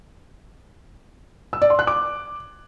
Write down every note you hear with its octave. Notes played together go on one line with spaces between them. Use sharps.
E6
D5
C6
F#6
D6